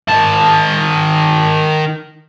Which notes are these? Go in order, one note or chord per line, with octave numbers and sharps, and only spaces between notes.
D#3 A5